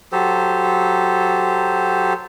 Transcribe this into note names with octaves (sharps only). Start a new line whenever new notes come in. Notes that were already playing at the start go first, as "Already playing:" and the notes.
F#3 G4 A4 C5